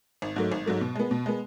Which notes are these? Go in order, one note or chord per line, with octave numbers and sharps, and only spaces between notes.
G#1
G#2 F#3 A3
G#1
G#2 F#3 A3
B2
G#3 B3
B2
G#3 B3